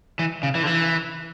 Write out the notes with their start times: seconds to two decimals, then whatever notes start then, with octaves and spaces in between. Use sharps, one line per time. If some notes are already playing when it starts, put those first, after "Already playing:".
0.19 E3
0.43 C#3
0.55 E3
0.63 D3
0.67 E3